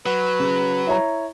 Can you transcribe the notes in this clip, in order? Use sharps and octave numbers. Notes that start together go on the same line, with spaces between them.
F#3 B4
C#3
E4 C#5 A#5